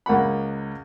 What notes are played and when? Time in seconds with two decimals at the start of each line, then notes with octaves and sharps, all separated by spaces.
0.06 C#2 A#3 F#5 B5